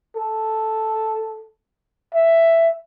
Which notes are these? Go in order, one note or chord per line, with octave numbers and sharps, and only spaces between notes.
A4
E5